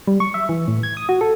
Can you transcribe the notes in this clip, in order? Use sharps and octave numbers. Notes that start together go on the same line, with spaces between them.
G3
C#6
E5
E3
A2
G#6
D#6
F#4
A4